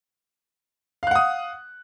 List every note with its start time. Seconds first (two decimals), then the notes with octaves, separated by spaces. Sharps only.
1.03 F5
1.07 F#6
1.11 F#5
1.15 D#6